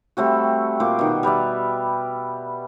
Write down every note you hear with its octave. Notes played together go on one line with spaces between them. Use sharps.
G3 A3 C4 F#4
A#2 C5 D6
B2 D#3
G3 B4 D5 E5